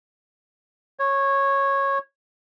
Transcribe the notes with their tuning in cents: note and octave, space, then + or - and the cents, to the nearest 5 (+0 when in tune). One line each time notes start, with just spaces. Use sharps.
C#5 -15